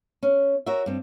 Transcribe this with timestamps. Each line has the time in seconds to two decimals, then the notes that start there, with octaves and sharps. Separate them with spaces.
0.23 C#4
0.66 F#4 A#4 C#5 E5
0.86 G2 C4